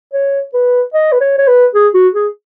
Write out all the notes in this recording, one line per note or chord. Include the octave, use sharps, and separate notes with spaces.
C#5
B4
D#5
B4
C#5
C#5
B4
G#4
F#4
G#4